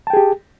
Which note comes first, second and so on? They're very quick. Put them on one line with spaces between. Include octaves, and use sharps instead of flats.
A5 G5 G#4 G4